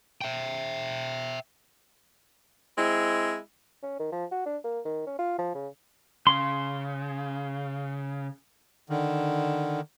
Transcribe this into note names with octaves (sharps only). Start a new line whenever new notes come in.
E5 G5
G#3 C4 E4
C#4
D#3
F3
F#4
D4
A#3
D#3
C#4
F4
F3
C#3
C#3 C6
D3 D#3